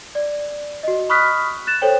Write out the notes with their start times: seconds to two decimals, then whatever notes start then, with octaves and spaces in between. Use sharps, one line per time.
0.15 D5
0.83 F#4 D#5
1.09 B5 C#6 D#6 F6 F#6 B6
1.67 F#6 A6 E7
1.82 A4 C5 C#5 G5